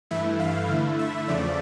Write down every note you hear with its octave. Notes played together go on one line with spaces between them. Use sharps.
G2 E3 A3 E4 E5
F5
D3 A3 E4
E5
E2 C#3 F3 A3 D5